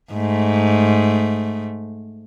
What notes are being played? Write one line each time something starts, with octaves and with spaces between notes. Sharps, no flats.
G#2 A3